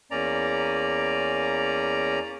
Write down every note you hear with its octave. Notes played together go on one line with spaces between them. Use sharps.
E2 A#3 C#4 D5 A#5